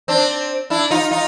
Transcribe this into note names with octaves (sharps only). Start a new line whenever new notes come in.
C4 D4
D4 E4
D#4 F4
D#4 F4